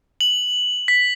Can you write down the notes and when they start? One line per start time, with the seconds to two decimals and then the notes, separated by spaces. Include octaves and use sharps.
0.21 F#7
0.88 B6